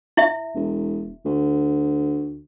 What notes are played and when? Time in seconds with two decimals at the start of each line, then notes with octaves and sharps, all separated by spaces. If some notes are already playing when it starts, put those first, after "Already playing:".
0.17 E4 E5
0.55 E1
1.25 D2